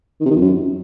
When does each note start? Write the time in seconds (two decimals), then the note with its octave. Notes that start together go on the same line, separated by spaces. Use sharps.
0.20 D#3
0.26 C3
0.31 D#3
0.36 F2
0.41 F#2